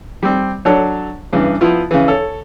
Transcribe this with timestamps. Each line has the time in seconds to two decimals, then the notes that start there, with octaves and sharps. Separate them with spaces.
0.23 G3 C4
0.65 F#3 D4 A4 C#5 A5
1.33 G2 C#3 E3
1.61 F3 B3 E4 F4
1.91 C#3 E3
2.08 A4 C#5